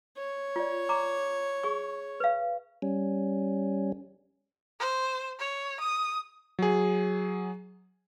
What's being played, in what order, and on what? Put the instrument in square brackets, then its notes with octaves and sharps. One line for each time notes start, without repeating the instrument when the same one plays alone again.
[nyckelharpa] C#5
[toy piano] F4 D5
A#5 D6
G#4 C#6
B4 F5
[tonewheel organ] G3 C#4
[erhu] C5
C#5
D#6
[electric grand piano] F#3 G#4